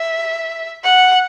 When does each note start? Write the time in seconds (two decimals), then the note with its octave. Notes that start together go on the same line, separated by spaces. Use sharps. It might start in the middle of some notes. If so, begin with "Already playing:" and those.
Already playing: E5
0.84 F#5